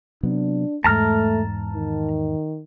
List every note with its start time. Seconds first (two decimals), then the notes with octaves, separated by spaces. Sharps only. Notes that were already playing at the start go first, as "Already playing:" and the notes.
0.23 C3 F#3 B3 D4
0.84 E2 G#2 A3 A5 A#5 F6
1.74 D#3